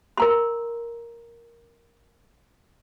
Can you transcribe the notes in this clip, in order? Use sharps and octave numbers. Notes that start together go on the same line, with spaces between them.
A#4 A#5 C6